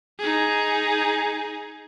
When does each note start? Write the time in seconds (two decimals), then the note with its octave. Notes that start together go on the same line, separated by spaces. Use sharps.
0.19 D#4 G#4